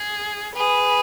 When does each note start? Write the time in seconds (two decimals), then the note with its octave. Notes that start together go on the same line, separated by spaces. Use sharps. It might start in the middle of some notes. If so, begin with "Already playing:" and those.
Already playing: G#4
0.55 G#4 B4